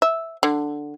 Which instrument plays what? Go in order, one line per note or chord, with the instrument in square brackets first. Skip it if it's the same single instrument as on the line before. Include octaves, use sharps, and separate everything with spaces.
[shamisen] E5
D3